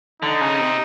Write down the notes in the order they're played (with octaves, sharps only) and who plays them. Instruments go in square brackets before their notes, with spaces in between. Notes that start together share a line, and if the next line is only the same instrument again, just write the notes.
[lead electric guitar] D3 [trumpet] D#4
[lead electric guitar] C#3
C3